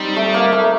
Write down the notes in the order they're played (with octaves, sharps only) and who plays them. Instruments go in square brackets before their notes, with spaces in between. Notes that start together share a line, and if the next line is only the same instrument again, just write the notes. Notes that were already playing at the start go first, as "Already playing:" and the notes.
Already playing: [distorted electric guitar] G3 [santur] C4 D#4
[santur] A3
A#3
A3